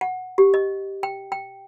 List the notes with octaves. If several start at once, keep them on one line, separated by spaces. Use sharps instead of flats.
F#5
G4
D#5
G5
G5